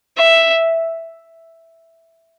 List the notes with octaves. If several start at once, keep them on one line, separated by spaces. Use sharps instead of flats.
E5